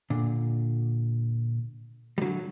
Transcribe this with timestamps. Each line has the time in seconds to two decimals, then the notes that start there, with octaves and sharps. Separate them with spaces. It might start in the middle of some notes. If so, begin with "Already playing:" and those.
0.10 A#2 D3
2.18 G3
2.22 D3 F#3